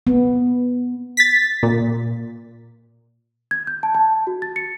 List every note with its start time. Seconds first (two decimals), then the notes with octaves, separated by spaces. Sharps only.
0.07 B3
1.17 A6 B6
1.63 A#2
3.51 G#6
3.67 G6
3.83 A5
3.95 A5
4.27 F#4
4.42 A6
4.56 C#7